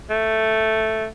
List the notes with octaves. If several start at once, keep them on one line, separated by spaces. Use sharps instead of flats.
A3